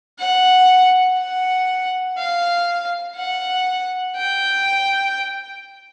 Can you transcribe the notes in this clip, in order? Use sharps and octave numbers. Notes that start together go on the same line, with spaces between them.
F#5
F#5
F5
F#5
G5